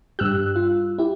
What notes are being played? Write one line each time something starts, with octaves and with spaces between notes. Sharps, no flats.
G2 G4 E6 F#6
F4
E4 G4